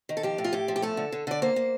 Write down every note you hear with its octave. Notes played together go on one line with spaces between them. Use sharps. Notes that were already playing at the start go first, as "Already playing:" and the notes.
D#3
A4
F3 G4
A2
F4
A2 G4
F3
G4
A3 A4
D3
D3
D3 D5
A#3 C5
A#3